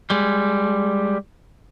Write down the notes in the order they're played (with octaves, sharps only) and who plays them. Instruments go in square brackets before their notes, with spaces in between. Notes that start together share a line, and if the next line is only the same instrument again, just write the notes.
[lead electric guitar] G3 G#3